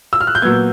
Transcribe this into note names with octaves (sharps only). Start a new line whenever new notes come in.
E6
F6
F#6
G6
A#2 F#3 B3 G#6